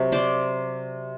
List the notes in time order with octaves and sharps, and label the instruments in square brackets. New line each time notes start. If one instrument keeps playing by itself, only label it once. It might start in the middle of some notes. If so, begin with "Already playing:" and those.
Already playing: [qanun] C3 F#3
C5 D5